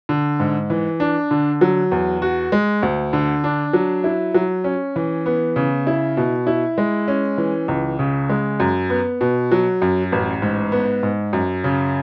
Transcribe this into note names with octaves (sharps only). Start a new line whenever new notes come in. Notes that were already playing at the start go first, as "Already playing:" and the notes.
D3
G#2
E3
D4
D3
F#3
E2
F#4
G#3
D2
D3
D4
F#3
E4
F#3
C#4
E3
B3
C#3
E4
B2
E4
G#3
C#4
E3
C#2
C#3
G#3
F#2
B3
B2
F#3
F#2
A1
G#2
B3
G#2
F#2
C#3